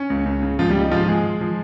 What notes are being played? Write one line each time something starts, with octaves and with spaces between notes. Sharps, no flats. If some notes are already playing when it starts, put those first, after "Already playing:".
Already playing: C#4
C#2
C#2
C#3
C#2 F3 F4
G3 G4
C#3
D#4
G#2 F3 F4
F3 G#3 G#4
F3
F3